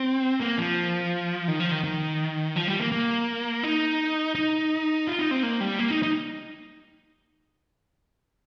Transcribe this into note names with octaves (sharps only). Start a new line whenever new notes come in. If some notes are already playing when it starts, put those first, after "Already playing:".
Already playing: C4
A#3
F3
D#3
F3
D#3
D#3
F3
G3
A#3
A#3
D#4
D#4
F4
D#4
C4
A#3
G3
A#3
D#4
D#4